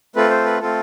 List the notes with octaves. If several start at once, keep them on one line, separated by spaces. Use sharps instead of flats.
A3 C4 F4 A4 B4
C5
B4
A3 C4 F4 A4